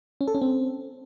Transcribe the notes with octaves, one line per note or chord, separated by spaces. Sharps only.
C#4
A4
C#4
C4